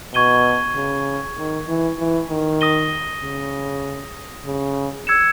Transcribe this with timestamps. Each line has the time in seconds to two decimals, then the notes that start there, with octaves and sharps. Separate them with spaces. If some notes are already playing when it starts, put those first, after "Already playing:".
0.14 B2 C#6 G#6 D#7 G7
0.76 C#3
1.37 D#3
1.68 E3
1.99 E3
2.29 D#3
2.61 D#6 A#6 D#7 G7
3.22 C#3
4.45 C#3
5.07 E6 G#6 C#7 E7